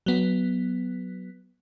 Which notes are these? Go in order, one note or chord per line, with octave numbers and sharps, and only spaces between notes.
F#3 B3